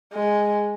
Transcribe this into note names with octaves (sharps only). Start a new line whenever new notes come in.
G#3